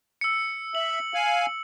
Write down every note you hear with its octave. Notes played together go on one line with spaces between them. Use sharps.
E6 C#7
E5 F#7
F5 G#5